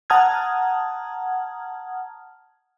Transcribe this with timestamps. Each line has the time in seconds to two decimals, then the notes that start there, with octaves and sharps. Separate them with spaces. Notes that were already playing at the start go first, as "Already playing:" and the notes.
0.10 F#5 A5 A#5 D#6 F6 G#6